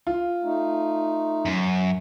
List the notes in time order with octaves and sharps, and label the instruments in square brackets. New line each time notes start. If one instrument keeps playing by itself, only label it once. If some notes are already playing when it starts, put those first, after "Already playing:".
[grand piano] F4
[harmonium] A3 D#4
[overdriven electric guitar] F#2